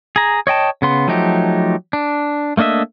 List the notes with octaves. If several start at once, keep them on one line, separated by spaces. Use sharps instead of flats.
G#4 A#5
C#5 D#5 G5 A5
C#3 B3 C6
F3 F#3 A3 D#4 G4
D4
A3 A#3 D4 D#5 E5